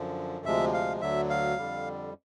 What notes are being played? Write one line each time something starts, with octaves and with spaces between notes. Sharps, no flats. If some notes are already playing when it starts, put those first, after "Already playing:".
Already playing: F#2 D3 F3
D2 C3 F3 G#3 E5
F5
D2 D3 F#3 E5
F5
F2 D3 G3